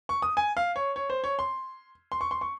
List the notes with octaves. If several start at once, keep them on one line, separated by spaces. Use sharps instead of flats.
C#6
D#6
G#5
F5
C#5
C#5
C5
C#5
C6
C6
C#6
C6
C#6